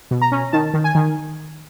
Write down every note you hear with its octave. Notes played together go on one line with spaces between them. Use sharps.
B2
A#5
C#4
D#3 A5
D#3
G#5
D#3